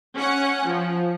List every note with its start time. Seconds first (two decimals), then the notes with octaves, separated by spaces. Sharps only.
0.16 C#4 F#5
0.67 F3